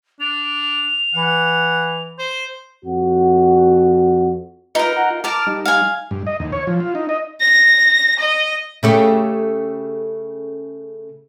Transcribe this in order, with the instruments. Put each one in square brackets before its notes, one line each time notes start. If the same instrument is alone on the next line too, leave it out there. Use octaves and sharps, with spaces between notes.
[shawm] D4 [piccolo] F7
[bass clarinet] E3 [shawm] F#5
[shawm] C5
[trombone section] F2 F#4
[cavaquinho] D#4 A#4 [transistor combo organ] F4 B4
[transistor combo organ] F#5 A#5
F4
[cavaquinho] A#4 A5 [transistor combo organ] D6 F6
[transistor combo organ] G3 D#4
[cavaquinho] F5 G#5
[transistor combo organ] G2
D#5
D#2
C#5
F3
F4
D#4
D#5
[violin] A#6
D#5
[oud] C#3 A3 G4